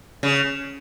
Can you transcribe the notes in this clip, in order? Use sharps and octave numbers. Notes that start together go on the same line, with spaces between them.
C#3